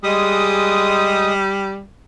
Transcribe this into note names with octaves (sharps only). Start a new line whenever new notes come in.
G3 G#3 D#6